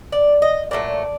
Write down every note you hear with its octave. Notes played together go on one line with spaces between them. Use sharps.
D5
D#5
A#2 F#3 A3 D5